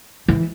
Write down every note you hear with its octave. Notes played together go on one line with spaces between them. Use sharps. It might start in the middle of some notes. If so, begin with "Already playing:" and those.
E3